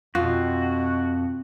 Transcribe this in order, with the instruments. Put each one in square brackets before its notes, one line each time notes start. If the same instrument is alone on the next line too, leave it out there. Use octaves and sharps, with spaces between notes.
[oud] F2 [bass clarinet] B2 [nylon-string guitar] F4 [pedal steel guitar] F#4